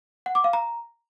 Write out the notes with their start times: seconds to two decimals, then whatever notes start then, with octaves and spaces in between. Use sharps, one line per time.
0.26 F#5
0.35 D6
0.44 F5
0.53 A#5